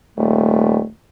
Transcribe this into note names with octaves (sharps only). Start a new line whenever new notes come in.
D#1 A3